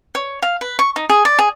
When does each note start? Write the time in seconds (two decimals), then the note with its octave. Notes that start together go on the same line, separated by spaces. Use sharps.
0.15 C#5
0.42 F5
0.61 B4
0.79 C#6
0.96 D#4
1.10 G#4
1.25 D5
1.39 G#4